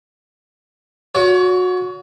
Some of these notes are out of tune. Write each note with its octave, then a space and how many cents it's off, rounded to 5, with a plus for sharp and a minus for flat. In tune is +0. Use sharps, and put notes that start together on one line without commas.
F#4 -25 C#5 +35